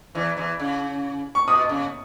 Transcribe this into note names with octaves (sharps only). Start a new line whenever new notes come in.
E2 E3
E2 E3
C#3
C#6
B2 D#6
C#3